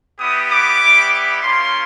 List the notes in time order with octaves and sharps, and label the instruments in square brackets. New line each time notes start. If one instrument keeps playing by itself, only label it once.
[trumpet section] G3 B3 E4 G4 D#6
D6
G3 B3 E4 G4
A#3 C#4 F4 C6